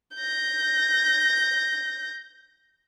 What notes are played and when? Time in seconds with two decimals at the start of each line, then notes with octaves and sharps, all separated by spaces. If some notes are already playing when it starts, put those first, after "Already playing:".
0.16 G6 A#6